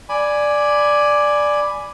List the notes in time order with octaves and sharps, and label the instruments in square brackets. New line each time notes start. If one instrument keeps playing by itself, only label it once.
[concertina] D5 G#5 B5